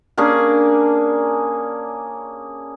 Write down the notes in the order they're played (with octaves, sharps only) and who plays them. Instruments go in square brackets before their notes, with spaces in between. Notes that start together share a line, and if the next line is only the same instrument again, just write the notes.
[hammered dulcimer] A#3 C#4 D4 G#4